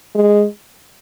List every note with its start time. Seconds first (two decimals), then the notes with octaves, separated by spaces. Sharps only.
0.15 G#3